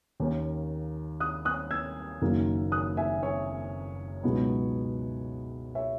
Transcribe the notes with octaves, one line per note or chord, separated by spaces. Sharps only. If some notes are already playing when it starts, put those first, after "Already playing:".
D#2 D#3 A#3 C#4
D#6 F#6
D#6 F#6
E6 G#6
F#1 F#2 D#3 F#3 A#3
D#6 F#6
E5 G#5
C#5 E5
C#2 B2 F#3 B3 D#4
C#5 E5